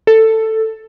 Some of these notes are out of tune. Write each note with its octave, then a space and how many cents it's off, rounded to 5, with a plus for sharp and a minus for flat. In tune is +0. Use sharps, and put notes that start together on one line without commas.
A4 +10